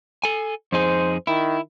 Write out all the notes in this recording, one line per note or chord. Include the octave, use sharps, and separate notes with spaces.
A4 G#5
F2 D#4 G#4 C5
D#3 E4